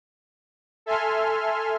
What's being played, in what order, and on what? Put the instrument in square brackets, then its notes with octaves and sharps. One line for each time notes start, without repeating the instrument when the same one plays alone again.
[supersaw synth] A4 E5 G#5 C6 F6